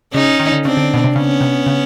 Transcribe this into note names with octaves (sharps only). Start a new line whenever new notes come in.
C#3 C#4 D#4
D#3
D3
C#3 C4 D4
D3
B2
C3
C#3 B3 C#4
C3
C#3